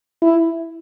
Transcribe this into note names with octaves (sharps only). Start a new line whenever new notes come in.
E4